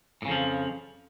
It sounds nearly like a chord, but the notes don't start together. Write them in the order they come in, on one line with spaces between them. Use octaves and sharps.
A2 C#3 F2 F3